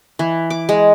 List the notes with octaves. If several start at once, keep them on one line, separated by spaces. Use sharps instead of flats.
E3
D6
G#3